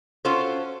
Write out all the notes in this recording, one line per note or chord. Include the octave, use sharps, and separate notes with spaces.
C#4 F4 F#4 A4 C5